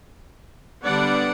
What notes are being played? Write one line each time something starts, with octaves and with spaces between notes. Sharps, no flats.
D3 G3 B3 D4 D5 F#5